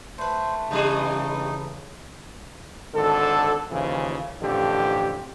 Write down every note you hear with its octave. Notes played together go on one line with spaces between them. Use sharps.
A3 B4 C5
G2 C#3 E3 G3 D#4 G#4
G#1 D3 A4
D#2 C#3 E3 F3
A1 F2 D3 G4